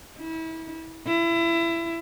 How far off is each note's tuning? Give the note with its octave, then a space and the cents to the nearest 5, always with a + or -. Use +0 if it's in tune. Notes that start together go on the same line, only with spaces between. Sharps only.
E4 -30
E4 +25